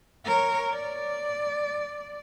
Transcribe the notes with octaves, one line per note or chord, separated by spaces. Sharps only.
A#4 C#5
D5